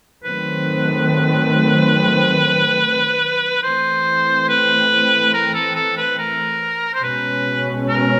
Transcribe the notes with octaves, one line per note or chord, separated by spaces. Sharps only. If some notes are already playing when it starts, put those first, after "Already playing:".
D#3 F#3 A3 C4 B4
E3 A3 C4 C5
B4
A#4
A4
A4
B4
A#4
C5
B2 G#3 C#4 B4
A#4